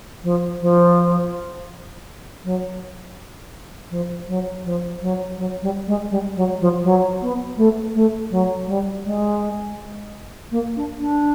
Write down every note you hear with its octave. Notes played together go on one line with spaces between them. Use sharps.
F3
F3
F#3
F3
F#3
F3
F#3
F#3
G3
G#3
G3
F#3
F3
F#3
B3
A3
A3
F#3
G3
G#3
A#3
D4
D4